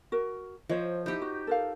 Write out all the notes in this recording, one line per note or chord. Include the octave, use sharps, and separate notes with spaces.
F#4 A#4
F3 C5 C#5 D#5
D#4 E4 G4
F#4
A4 A#4 F5